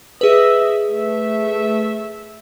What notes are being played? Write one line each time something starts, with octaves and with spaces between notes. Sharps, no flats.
G#4 B4 D#5 E5
A3 E5